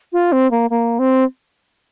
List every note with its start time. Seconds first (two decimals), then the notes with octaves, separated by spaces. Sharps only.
0.13 F4
0.32 C4
0.51 A#3
0.70 A#3
0.99 C4